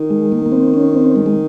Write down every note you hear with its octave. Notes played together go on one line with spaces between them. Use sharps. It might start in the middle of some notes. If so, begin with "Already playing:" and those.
Already playing: D#3
G#3
A#3
A#3
C4
C#4
C4
G#3
G#3